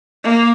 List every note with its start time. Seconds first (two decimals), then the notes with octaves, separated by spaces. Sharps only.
0.24 A#3